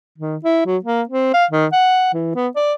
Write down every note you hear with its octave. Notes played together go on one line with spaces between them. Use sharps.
D#3
E4
F#3
A#3
C4
F5
D#3
F#5
E3
B3
D5